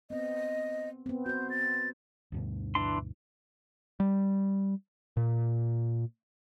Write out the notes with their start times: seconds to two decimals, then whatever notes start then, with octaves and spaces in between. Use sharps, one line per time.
0.10 B3 C4 D#5
1.06 B3 C4
1.26 F#4 C5 G6
1.50 A6
2.32 D2 G2 B2
2.75 E3 D4 C6
4.00 G3
5.17 A#2